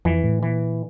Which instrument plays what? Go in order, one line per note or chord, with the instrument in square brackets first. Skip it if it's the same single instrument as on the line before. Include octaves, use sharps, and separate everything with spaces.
[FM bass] F2 [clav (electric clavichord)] E3
[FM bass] A2
[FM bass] A#2 [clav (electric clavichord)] E3